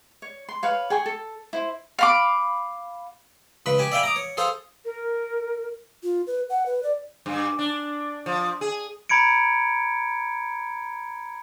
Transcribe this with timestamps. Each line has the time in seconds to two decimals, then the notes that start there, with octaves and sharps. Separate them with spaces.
0.22 C#5
0.49 C6
0.63 B4 C#5 F5
0.90 G#4 G5 G#5 C#6
1.06 A4
1.53 E4 C5
1.99 F5 B5 D6
3.66 C#2 C#3 B4 B5
3.78 G4 G#5 A5
3.92 D5 E5 F5 G5 G#5 B5
4.03 A#5 D6 D#6
4.16 C#5
4.37 G#4 A4 C5 F5
4.85 A#4
6.03 F4
6.27 B4
6.50 F#5
6.66 B4
6.83 D5
7.26 G2
7.59 D4
8.26 F3
8.61 G#4
9.09 A#5 B5 G#6 C#7 D7